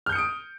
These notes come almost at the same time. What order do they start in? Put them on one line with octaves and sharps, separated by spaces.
F6 G6 C#7 D#6 D7